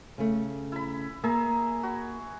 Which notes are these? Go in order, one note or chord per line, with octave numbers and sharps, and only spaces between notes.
C#3 A3
E4 B5
A#3 G#4 E5 A#5
F#4 B5